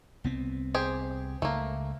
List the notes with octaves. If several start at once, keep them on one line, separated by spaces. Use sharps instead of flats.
C2 B3 C4
G4 G#4 C5
C#2 A3 A#3